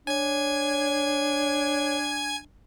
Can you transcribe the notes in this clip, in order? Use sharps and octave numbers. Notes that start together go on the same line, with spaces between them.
D4 C#5 G#5 G#6